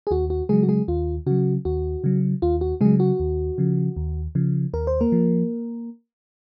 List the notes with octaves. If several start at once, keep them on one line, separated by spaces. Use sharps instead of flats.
G#4
D#2 F#4
F#4
C#3 F#3 G#3 G#4
F#4
G#3 G#4
D#2 F4
C#3 F#3 F#4
D#2 F#4
C#3 F#3
D#2 F4
F#4
C#3 F#3 G#3 G#4
F#4
D#2
C#3 F3
D#2
C#3 F3
D#2 A#4
C5
A#3 A#4
F3